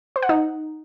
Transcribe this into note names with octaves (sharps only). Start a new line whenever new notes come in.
C5
F#5
D#4